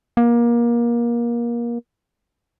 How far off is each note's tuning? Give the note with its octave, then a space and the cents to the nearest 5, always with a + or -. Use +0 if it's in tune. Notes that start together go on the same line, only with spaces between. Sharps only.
A#3 +25